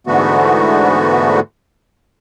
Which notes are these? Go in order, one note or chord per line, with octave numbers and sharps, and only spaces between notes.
G#2 D3 E3 A3 B3 F#4